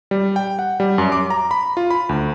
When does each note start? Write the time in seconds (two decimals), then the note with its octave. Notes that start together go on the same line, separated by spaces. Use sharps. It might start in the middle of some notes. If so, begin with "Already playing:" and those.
0.11 G3
0.36 G5
0.59 F#5
0.80 G3
0.98 F#2
1.12 D6
1.30 A#5
1.51 B5
1.77 F4
1.90 B5
2.09 D2